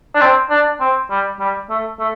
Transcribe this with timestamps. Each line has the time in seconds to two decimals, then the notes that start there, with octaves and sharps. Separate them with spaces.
0.15 D4
0.21 C4
0.50 D4
0.81 C4
1.10 G3
1.40 G3
1.70 A3
2.00 A3